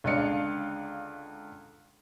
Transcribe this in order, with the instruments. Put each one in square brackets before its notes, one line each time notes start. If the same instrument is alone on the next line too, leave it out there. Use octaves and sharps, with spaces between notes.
[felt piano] C#2 D3 D4 D#5 F5 C#7